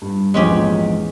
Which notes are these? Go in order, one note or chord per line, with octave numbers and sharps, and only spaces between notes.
G2
A#1 E2 G#2 G#3 C#4 G4